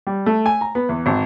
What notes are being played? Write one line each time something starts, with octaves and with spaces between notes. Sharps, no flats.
G3
A3
G#5
A#5
B3
E2
G#1